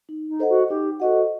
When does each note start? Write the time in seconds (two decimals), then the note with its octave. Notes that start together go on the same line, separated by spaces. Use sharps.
0.09 D#4
0.29 D#4
0.39 A4 C5 D#5 F#5
0.49 F#4
0.69 D#4 G4
1.00 F#4 A4 C5 D#5 F#5